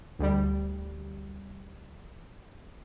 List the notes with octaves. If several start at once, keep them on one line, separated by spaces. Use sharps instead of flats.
D2 G3